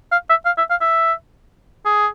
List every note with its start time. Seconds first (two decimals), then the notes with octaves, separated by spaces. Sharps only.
0.12 F5
0.29 E5
0.46 F5
0.58 E5
0.70 F5
0.81 E5
1.86 G#4